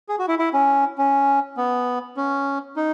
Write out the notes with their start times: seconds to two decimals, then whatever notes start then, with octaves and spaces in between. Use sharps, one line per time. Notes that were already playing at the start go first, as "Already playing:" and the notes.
0.09 G#4
0.19 F#4
0.28 E4
0.39 E4
0.53 C#4
0.98 C#4
1.57 B3
2.17 C#4
2.76 D#4